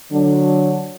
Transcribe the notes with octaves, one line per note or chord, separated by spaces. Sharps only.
D3 F#3 D4